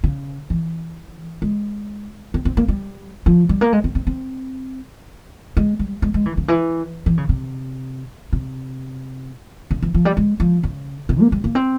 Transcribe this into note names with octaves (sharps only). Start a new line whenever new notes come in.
C#3
E3
G#3
C4
C4
A#3
G3
F3
G3
A#3
G#3
C4
C4
C4
G#3
G3
G#3
G#3
E3
C#3
E3
E3
C#3
C3
C3
C#3
E3
F3
G3
G#3
F3
C#3
C3
A#3
G3
A#3
C4